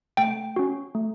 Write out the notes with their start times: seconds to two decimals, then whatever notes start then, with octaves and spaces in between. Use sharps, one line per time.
0.17 A3 G5
0.56 C#4 F#4
0.95 A3